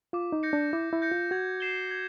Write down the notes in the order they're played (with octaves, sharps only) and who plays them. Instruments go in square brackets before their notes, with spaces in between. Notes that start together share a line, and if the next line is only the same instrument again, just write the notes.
[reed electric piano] F4 [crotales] D6
[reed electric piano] D#4
[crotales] G6 A#6 C#7
[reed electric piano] D4
[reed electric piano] E4 [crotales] D6
[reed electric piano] E4
[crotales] G6 A#6 C#7
[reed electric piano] F4
[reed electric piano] F#4 [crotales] G#6
[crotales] C7 E7 G7
G#6